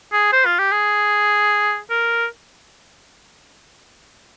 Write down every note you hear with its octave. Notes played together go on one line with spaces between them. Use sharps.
G#4
C5
F4
G4
G#4
A#4